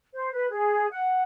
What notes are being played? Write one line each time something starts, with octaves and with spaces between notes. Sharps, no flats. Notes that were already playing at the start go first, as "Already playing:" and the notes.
C5
B4
G#4
F#5